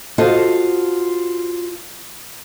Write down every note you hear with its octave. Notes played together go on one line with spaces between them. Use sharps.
F4 F#4 A4 C5 D#5